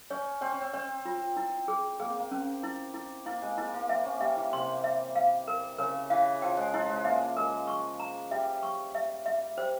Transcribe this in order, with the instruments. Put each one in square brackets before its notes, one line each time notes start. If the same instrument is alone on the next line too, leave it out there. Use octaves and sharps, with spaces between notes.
[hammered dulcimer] C#4 [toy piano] C#5
[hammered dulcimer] C4 [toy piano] C#5
[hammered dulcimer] C#4
C4
[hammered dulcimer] C4 [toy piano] C#5
[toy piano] F4
E4
G#4
[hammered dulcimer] A#3 [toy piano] G#4
[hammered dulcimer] C4
A#3
[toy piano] C#4
E4
E4
[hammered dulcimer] A#3 [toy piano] E4
[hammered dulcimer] G#3
[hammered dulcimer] A#3 [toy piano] E4
[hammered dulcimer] A#3
[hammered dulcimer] C4 [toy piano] E5
[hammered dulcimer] C#4
[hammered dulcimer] G3 [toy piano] E5
[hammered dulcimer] E3
[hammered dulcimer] C3 [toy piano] C6
[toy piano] E5
F5
A#4
[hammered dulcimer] C#3 [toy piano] A#4
[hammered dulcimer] E3 [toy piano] F5
[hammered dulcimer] F3 [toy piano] G5
[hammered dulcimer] G#3
[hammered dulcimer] G#3 [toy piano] E4
[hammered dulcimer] G#3
[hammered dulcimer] A#3 [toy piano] E5
[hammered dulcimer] G#3 [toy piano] A#4
[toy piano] C#6
A#5
[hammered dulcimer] G3 [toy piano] E5
[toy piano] C#6
E5
E5
[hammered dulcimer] G3 [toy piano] C5